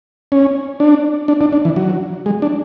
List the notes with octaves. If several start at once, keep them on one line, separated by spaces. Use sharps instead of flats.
C#4
D4
D4
D4
D4
E3
F#3
G#3
D4